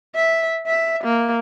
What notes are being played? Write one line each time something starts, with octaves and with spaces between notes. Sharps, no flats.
E5
E5
A#3